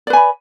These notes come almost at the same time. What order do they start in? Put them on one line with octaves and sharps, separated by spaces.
D5 B4 G#5 B5